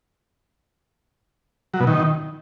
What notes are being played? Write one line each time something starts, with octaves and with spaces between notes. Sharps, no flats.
F#3
B2
D#3